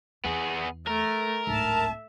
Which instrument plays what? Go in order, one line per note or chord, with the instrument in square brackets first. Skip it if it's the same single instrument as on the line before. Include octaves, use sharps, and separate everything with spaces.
[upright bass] E2 [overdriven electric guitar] B3 G#4
[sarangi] A3 [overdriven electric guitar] A#4
[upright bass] D1 G#1 [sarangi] E5 [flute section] A5